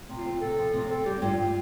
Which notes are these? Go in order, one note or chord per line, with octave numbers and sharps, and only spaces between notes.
C3
F4
C4
C3 A4
F3
C3
C4 A4
G2 G4
G2 F4